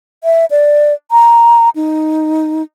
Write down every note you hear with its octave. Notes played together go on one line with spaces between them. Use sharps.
E5
D5
A#5
D#4